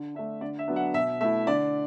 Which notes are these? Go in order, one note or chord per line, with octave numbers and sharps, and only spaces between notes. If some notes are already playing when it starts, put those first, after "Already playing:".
Already playing: D3
A3 D4 E5
D3 D5
E5
F#3 B3 D4
F#5
B2 E5
A3 E4 E5
D3 D5